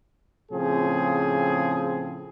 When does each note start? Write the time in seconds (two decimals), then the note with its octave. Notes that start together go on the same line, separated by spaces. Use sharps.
0.52 A2 C#3 F3 C4 G#4